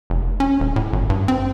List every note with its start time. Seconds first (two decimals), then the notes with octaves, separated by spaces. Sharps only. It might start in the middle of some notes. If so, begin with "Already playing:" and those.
0.10 F1
0.40 C#4
0.60 D#1
0.76 A2
0.93 G#1
1.10 G2
1.28 C4